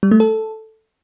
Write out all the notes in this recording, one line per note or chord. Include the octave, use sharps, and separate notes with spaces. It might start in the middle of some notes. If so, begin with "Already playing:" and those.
G3
A3
A4